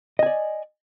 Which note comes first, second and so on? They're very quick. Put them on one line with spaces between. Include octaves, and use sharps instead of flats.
D#5 G#5 D5